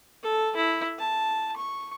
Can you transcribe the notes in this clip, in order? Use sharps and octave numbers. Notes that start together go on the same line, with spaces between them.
A4
E4
A5
C#6